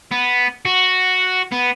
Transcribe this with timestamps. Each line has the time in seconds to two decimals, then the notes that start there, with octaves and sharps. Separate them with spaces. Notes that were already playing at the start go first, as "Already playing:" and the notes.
0.11 B3
0.65 F#4
1.52 B3